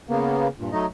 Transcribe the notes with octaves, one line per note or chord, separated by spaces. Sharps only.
C#3 A#3 B3
G2 A#2
F#3 A3 D#4 D#5